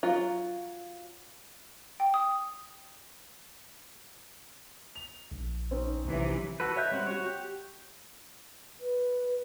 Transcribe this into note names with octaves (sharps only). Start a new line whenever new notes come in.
F#3 F4
G5
D#6
F7
A#1
C4 C#4 D#4
B1 C3 E3 F#3
F#4 A4 B4
C#5 D#5 E5 F#6 G6
G3 C4 C#4 F#5
F#4 C#5
G4
B4